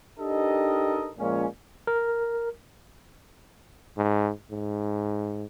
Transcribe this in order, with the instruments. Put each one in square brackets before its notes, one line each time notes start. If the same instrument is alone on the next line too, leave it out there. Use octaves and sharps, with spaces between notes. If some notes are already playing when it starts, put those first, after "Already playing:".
[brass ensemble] D4 D#4 G4 A4 A#4 D#5
A#2 F3 G#3 C#4
[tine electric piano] A#4
[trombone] G#2
G#2